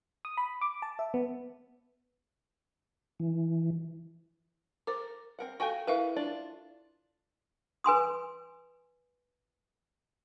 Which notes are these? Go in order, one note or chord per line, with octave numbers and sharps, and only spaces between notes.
D#6
B5
D6
A5
E5
B3
E3
A#4 C5 D6
C4 A#4 F#5
F#4 A4 F5 G5 G#5 C#6
E4 A#4 B4 E5 F5
D4 F4 D5
B4 G#5 C6 D#6